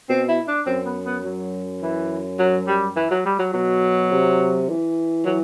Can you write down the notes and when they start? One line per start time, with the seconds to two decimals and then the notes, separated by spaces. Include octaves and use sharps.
0.10 B2 C4
0.29 E4
0.48 D4
0.66 F#2 C4
0.85 B3
1.05 B3
1.25 F#3
1.82 E3
2.39 F#3
2.68 G3
2.96 E3
3.11 F#3
3.26 G3
3.39 F#3
3.54 B2 F#3
4.12 C3
4.69 E3
5.25 E3 F#3